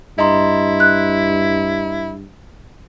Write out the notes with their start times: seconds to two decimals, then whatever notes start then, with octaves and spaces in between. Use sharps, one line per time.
0.19 G2 E4 D#5 A#5 C6
0.80 F#6